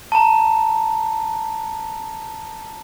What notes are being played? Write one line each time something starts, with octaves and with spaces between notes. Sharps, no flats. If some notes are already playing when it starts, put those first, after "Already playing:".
A5 A#5